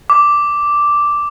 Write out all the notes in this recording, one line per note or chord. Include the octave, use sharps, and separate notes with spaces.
D6